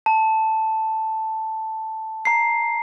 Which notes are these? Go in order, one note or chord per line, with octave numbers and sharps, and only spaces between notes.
A5
A#5 C7